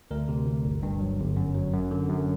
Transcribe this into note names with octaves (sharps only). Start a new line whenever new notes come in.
D2 A#4
C3
D2
G1
G2
F#3
G1
F#2
F#3
F#2
D3
F#2